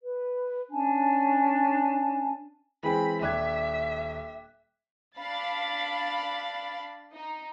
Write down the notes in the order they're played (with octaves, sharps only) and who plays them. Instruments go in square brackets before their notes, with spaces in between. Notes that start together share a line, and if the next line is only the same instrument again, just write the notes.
[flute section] B4
C#4 D4 G#5 A5
[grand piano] E3 G#3 C4 [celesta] G#4 G5 G#5 [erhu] B5
[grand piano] D#1 D4 G#6 [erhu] E5 [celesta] G5 D6 F#6
[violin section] D4 F5 B5 A6
D#4